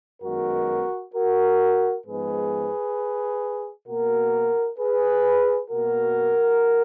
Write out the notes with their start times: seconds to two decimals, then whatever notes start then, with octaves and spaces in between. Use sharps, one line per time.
0.23 F#2 D#3 G#3 B3 F#4 A#4
1.14 F#4 A#4
2.05 G#2 F3 G#3 B3 G#4 B4
3.88 B2 A#3 F#4 A#4
4.79 G#4 B4
5.70 B2 A#3 F#4 A#4